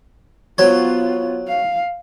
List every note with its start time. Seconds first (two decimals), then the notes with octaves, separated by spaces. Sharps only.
0.58 F#3 B3 F4 C5 C#5
1.48 F5